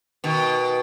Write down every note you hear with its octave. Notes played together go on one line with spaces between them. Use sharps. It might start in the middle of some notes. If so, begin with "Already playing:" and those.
B2 D#3